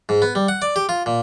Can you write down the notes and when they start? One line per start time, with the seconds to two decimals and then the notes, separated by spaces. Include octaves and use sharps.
0.09 G#2
0.22 B3
0.35 G3
0.48 F#5
0.62 D5
0.76 G4
0.89 F4
1.06 A#2